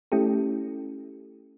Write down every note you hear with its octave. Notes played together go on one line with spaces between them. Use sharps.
A3 C#4 E4 G4 A4